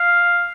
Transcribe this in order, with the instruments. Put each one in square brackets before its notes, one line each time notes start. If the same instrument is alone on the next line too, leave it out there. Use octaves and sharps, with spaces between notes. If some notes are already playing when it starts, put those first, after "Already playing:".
Already playing: [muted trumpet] F5